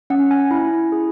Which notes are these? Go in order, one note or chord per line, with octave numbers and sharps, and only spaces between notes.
C#4 F#5
G#5
E4 G#5
G#4